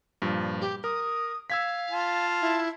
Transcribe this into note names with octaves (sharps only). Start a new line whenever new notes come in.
G2 A#2 F3
G4
A#4 D#6
F5 E6 G#6 B6
F4 A5
E4